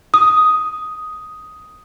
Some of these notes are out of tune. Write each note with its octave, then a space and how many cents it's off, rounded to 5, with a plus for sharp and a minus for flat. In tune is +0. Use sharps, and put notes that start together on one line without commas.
D#6 +5